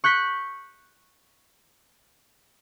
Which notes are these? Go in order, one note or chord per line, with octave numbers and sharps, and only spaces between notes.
C#6 F#6 G6 B6